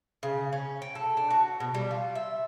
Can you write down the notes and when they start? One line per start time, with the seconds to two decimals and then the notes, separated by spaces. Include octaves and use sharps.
0.23 C#3
0.53 C#4
0.82 G5
0.95 A4
1.17 D4
1.30 F#4
1.60 B2
1.74 G3
1.91 F4
2.15 E5